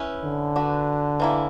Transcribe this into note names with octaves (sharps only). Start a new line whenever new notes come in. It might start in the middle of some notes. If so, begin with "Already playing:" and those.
Already playing: C#4 E4 B4
D3
D4 F#4 B4
E3 A#3 E4